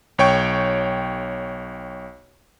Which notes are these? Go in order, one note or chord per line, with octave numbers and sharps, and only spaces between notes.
B1 C#5 G5 C#6